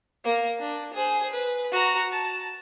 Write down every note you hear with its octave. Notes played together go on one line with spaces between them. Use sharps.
A#3 A#4
D4
G#4 C5
B4
F#4 A#5
A5